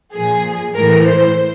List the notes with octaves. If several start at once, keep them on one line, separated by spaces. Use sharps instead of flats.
A#2 F3 G#4
A2 E3 A#4
C5